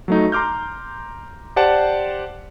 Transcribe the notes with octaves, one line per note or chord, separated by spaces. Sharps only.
F#3 A3 D#4
A#5 C6 D6 F6 G6
G4 C5 D5 F#5 A5